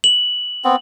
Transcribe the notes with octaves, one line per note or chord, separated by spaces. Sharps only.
F#7
B3 C4